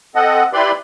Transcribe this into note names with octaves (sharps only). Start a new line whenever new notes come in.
C4 A4 D#5 F#5
E4 G4 B4 D5 B5 C6